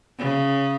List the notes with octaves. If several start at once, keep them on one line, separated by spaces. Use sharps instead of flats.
C#3